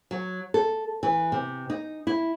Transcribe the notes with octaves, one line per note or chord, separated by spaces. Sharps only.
F#3
A4
E3
C3
D#4
E4